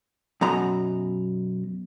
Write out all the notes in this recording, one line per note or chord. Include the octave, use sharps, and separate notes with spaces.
F#2 B2 A#5